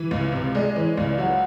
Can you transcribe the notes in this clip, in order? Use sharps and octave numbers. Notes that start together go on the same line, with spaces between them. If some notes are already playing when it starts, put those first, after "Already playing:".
Already playing: E3
C#2
C3
G#3 D5
D5
E3 C#5
D#5
C#2 D5
F#3 F#5